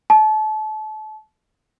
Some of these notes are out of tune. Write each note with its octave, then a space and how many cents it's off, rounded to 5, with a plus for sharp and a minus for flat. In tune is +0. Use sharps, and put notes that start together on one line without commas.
A5 -30